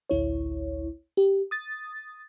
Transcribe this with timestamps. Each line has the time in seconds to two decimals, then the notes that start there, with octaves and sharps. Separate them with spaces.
0.10 A1 D2 E4 C#5
1.17 G4
1.51 D#6 A6